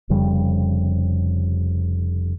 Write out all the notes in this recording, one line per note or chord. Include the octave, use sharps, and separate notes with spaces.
F1 F2 C#3 G3